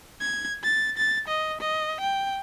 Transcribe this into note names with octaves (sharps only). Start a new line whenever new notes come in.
G#6
A6
A6
D#5
D#5
G5